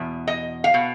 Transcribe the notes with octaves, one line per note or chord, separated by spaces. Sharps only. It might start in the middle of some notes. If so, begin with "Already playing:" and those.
Already playing: E2 B2
D#5
F5
B2